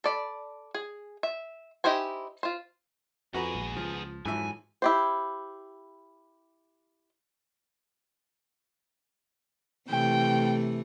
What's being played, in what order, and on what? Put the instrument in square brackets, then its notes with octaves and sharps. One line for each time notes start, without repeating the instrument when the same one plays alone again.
[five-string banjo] A4 D5 B5
G#4
E5
D#4 E4 G4 C5 G#5
F4 C5
[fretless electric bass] F2 [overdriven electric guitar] B3 G#4 [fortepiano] F#4 B4 A#5
[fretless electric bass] A#1 G#3
[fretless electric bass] C#2 [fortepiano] F3
[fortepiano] F2 E3 E5 [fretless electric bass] G#2 F#3 [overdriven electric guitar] G#5
[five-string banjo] E4 G4 C5
[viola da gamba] C3 E3 A3 [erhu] G5